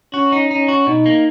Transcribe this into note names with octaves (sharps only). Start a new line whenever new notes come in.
C#4 F#4
D#4
C#4 D#4
F#4
B2 D#4
A#3